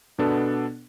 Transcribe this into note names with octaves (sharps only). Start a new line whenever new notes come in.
B2 B3 D4 A4